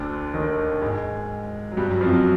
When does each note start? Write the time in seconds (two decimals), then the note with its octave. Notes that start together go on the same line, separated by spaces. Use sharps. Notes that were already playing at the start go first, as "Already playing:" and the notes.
Already playing: D2 D3
0.34 D#2 D#3
0.81 G#2 G#3
1.72 F#3
1.77 G2 G3
1.89 F#2 F#3
2.01 F2 F3
2.13 F#3